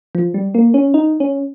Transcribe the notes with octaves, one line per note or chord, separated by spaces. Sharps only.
F3
G3
A#3
C#4
D#4
C#4